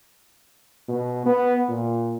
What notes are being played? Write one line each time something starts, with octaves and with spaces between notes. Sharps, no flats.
B2
B3
A#2